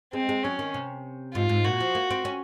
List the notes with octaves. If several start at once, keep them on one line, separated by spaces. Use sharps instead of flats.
G#3 C4
G#3
F#3 C#4
D#3
C3
G#2 F4
G#2
A#2 F#4
F3
A#3
C4
C#4